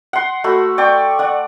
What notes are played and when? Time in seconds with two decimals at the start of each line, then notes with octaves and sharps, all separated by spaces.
0.13 F#5 C6
0.44 A3 F#4 B5
0.78 D5 G5 C#6
1.19 D5 F#5